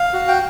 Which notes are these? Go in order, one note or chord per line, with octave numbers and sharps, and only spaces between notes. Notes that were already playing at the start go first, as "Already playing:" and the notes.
Already playing: F5
F#4
G5